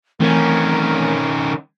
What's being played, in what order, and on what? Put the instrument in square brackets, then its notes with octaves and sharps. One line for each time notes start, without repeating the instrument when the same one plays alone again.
[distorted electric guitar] D#3 C#4 [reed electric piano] E3 A3 C4 [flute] A#4